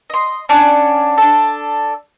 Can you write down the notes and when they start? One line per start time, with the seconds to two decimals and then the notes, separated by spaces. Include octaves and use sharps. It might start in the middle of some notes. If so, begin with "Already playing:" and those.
0.10 D#5 C6
0.49 C#4 D4 D5 F#5
1.18 D4 A4